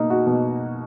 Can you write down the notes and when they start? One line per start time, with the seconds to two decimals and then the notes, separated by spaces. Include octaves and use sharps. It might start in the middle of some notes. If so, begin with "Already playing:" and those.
Already playing: B2 A#3 D#4
0.10 F#4
0.26 B2